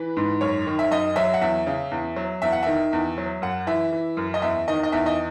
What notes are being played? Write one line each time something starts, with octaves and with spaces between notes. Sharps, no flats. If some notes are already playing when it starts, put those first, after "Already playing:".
Already playing: E3 B4
G#2
F#2 C#5
D#3
E5
F#2 D#5
F#3 E5
F#5
E2 E5
C#3
E2
F#3
E2 E5
F#5
D#3 E5
E2
F#3
F#2 F#5
E3 E5
E3
F#2
D#5
E2 E5
D#3 D#5
D#5
E2 E5
D#5